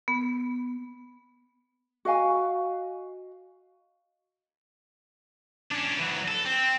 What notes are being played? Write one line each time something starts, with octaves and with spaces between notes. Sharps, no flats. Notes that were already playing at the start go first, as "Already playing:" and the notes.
B3
F#4 D#5 F5 G#5
C#4 D4
E3 F#3
A4
C4